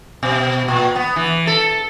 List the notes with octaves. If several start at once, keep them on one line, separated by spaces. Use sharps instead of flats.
B2
A#2
B3
E3
A4